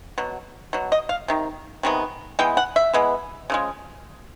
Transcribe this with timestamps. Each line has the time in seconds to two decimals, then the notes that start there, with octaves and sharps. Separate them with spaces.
0.18 B2 F#3
0.73 B2 F#3
0.92 D#5
1.09 F5
1.28 C3 D#3
1.83 C3 D#3 G#3 B3
2.39 E3 G#3 B3 G5
2.57 F#5
2.76 E5
2.94 E3 G#3 B3
3.50 C#3 F3 G#3